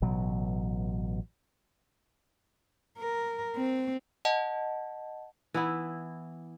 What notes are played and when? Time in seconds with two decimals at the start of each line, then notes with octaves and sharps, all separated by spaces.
0.02 A1 B2 F#3
2.98 A#4
3.56 C4
4.25 D#5 F#5 A5
5.54 E3 B3 E4